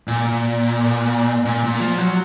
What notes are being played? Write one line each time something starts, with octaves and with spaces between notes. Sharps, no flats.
A#2
A#2
A#2
F3
F#3